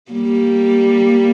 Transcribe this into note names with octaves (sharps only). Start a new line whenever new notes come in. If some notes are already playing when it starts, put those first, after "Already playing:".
G3 A#3